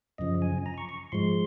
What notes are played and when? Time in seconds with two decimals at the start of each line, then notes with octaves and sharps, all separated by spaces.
0.18 F#2 C#3 F3 D#5
0.42 G#5
0.66 A#5
0.78 C#6
0.89 C#6
1.12 G#2 F3 G#3 C6